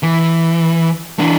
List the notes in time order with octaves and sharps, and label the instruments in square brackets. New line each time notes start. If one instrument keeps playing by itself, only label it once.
[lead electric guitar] E3
E3 D4